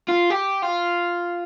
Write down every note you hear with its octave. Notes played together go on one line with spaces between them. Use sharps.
F4
G4
F4